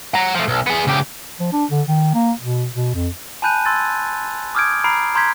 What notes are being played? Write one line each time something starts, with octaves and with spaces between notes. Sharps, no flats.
F#5 A#5
F3 A3
B1
B3 G#4
C#2 G4
F3
D4
D3
D#3
A#3
B2
B2
F2
G#5 A5 B5 F#6 G6 D#7
C6 E6 G#6 A6
D6 D#6 F6 G6 G#6 D7
A#5 B5 F6 C7 D7
A#5 C6 G6 G#6 B6